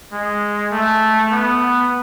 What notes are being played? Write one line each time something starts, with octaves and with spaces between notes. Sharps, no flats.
G#3
A3
B3